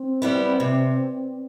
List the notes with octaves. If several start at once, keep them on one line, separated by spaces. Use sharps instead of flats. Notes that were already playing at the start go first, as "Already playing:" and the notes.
Already playing: C4
G3 B3 E4
C3